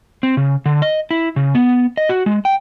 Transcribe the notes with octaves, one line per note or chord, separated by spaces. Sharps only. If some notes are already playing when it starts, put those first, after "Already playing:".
C4
C#3
D3
D#5
E4
C#3
B3
D#5
F#4
G#3
G5